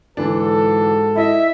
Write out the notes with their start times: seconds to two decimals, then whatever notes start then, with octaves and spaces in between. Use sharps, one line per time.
0.17 G#2 D3 E3 D4 F#4 A4
1.16 E4 D#5 E5